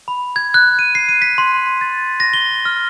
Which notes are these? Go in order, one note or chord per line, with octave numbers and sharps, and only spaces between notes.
B5
G#6
F#6
D#7
C7
D#7
B6
C6
A6
A#6
G7
F6